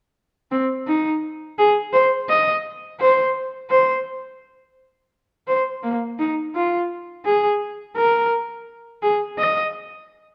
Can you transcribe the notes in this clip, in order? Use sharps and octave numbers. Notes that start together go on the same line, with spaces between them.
C4
D#4
G#4
C5
D#5
C5
C5
C5
A#3
D#4
F4
G#4
A#4
G#4
D#5